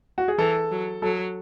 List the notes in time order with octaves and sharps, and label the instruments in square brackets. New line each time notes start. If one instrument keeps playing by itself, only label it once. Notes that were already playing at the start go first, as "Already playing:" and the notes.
[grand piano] F#4
G#4
[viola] E3 [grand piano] A4
[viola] F#3
[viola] F#3 [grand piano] A4